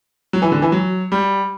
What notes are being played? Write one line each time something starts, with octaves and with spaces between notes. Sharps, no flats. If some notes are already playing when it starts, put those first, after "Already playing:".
F#3
E3
D3
E3
F#3
G3